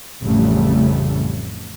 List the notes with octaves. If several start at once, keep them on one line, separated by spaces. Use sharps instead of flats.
A1 F2 C#3 G3 A3